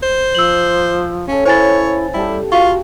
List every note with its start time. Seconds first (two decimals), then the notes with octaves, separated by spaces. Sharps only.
0.03 C5
0.35 F3 E6 F#7
1.27 C#3 C#4 A4
1.45 E4 C5 C#5 G#5 A6
2.14 G3 E4 G4 A4
2.52 F4 F#4 F5 C#6